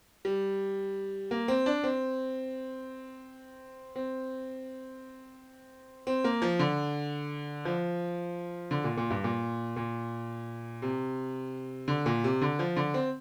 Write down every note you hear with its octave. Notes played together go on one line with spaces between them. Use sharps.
G3
A#3
C4
D4
C4
C4
C4
A#3
F3
D3
F3
D3
A#2
A#2
G2
A#2
A#2
C3
D3
A#2
C3
D3
F3
D3
C4